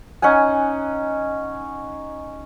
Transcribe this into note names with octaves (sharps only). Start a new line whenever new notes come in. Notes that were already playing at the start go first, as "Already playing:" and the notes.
C#4 D#4 F#5 G#5